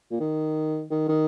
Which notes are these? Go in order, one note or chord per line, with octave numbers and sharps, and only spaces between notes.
A#2
D#3
D#3
D#3